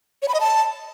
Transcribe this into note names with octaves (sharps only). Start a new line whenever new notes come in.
C#5
B5
D#5
A5